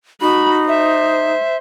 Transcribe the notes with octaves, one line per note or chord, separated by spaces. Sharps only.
D#4 F#4 B5
C5 E5